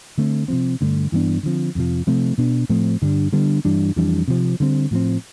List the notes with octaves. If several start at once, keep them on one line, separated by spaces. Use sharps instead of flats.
D3 A3 C4
C3 F3 C4
G2 D3 A3 D4
G2 E3 B3 D4
D3 F3 C4
F2 C3 F3
C3 F3 A3 C4
B2 B3 D4
A2 F3 A3 C4
G2 D3 G3 D4
D3 G3 B3 D4
G2 E3 G3 D4
F2 E3 G3 D4
C3 F3 C4
D3 G3 C4
A2 F3 C4